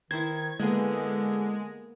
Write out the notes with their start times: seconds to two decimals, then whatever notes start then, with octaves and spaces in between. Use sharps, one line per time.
0.11 D#3 E4 C5 G#6
0.59 D3 G#3 A#3 B3 G#4